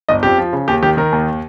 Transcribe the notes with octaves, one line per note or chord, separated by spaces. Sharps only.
G1 D#5
F2 G4
F3
C#3
D#2 G4
D#3 G4
D#3 A#4
D#2